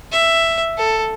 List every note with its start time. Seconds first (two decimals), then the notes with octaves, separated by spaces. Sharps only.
0.12 E5
0.78 A4